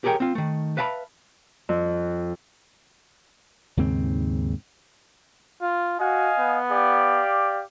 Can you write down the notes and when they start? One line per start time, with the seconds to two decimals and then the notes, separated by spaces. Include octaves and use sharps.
0.04 G4 G#4 A#4 C#5 G5
0.20 C4 F4
0.35 D#3 A3
0.77 B4 E5 F5 A5 B5
1.69 F2
3.77 D#2 G#2 C#3 C4
5.61 F4
5.99 F#4 D#5 F5 G#5
6.39 B3
6.70 G4 D5 F5